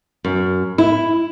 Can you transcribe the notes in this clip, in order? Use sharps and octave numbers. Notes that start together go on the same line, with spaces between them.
F#2
E4